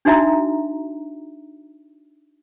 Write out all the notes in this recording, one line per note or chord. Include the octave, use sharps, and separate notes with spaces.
D4 D#4 F#4 E5 A#5